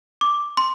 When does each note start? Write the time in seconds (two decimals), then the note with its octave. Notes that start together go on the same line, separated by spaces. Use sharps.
0.21 D6
0.57 C6